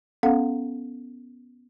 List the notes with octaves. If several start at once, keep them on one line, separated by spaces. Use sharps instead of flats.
B3 C#4 A4 F5 F#5